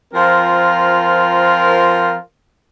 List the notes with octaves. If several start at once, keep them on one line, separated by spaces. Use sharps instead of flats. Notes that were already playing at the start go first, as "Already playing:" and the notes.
F3 C4 F4 A#4